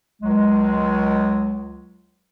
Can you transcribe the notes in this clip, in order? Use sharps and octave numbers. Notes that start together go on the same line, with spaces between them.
C#2 F#3 G#3